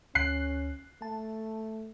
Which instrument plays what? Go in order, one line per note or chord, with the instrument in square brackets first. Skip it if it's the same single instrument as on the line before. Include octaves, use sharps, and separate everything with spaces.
[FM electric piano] D2 [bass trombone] C#4 [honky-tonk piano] F#6 C7
[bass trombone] A3 [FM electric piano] A5